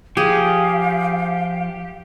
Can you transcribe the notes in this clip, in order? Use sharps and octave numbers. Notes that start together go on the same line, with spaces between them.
F3 G4 G#4 F5